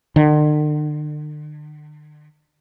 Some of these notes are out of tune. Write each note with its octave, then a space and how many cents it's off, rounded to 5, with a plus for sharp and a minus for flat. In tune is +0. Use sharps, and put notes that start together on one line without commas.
D3 +45